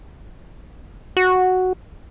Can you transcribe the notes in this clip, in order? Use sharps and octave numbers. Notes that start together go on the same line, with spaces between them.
F#4